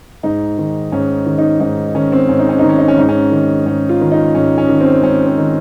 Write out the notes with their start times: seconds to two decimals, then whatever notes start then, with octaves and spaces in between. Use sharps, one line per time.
0.23 G#2 D#4
0.58 D#3
0.92 G#2 C#4
1.26 D#3
1.38 D#4
1.60 G#2 D#4
1.95 D#3 C#4
2.12 C4
2.29 G#2 C#4
2.39 D#4
2.49 C#4
2.59 D#3 D#4
2.69 C#4
2.78 D#4
2.88 C#4
2.97 G#2 D#4
3.09 C#4
3.32 D#3
3.66 G#2 C#4
3.89 F4
4.01 D#3
4.12 D#4
4.35 G#2 C#4
4.58 C#4
4.69 D#3
4.80 C4
5.03 G#2 C#4
5.27 C4
5.38 D#3